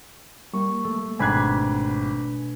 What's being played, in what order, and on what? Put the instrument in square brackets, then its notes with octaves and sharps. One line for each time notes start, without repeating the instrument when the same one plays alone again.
[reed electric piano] G3 A#3 [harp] C#6
[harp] A3
[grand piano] G#1 G#6 [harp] B2 D4 C7 [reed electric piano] G#5 B5 F#6